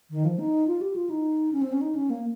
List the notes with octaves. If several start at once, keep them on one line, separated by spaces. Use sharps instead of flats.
D#3
F3
D#4
F4
G4
F4
D#4
C#4
C4
C#4
D#4
C#4
A#3